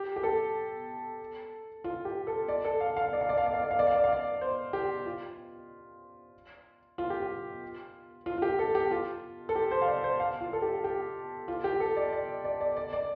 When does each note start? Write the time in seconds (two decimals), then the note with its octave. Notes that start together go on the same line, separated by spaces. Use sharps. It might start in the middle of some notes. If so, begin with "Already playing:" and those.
Already playing: G4
0.16 G4
0.23 A4
1.84 F4
2.05 G4
2.27 A4
2.48 D5
2.65 A4
2.80 F5
2.96 F5
3.13 D5
3.21 F5
3.29 D5
3.37 F5
3.46 D5
3.54 F5
3.63 D5
3.71 F5
3.79 D5
3.87 F5
3.95 D5
4.04 F5
4.12 D5
4.41 C5
4.73 G4
5.06 F4
6.98 F4
7.10 G4
7.23 F4
8.26 F4
8.38 F4
8.42 G4
8.59 A4
8.75 G4
8.91 F4
9.49 A4
9.56 G4
9.71 C5
9.82 F5
9.87 D5
10.04 C5
10.20 F5
10.41 F4
10.53 A4
10.62 G4
10.84 G4
11.48 F4
11.64 G4
11.80 A4
11.96 D5
12.12 D5
12.44 D5
12.61 D5
12.77 D5
12.93 D5